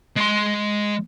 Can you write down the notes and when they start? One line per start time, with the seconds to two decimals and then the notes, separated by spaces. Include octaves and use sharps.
0.17 G#3 C6